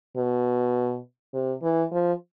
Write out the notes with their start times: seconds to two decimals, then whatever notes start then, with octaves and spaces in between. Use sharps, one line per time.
0.17 B2
1.34 C3
1.62 E3
1.92 F3